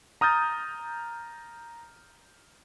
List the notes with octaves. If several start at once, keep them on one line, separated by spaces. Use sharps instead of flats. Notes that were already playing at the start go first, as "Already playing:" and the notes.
A#5 D#6 F6 G6 A6